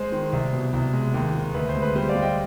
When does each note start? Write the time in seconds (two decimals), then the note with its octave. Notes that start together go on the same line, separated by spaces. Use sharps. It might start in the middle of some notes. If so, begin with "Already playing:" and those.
Already playing: G#3 C5
0.12 D#3
0.32 C2
0.53 B2
0.73 C2
0.93 G#3
1.14 D#2
1.35 D#3
1.54 D2 B4
1.69 C5
1.75 G#3
1.82 B4
1.95 G3 C5
2.09 D5 F5
2.15 G3
2.22 D#5 G5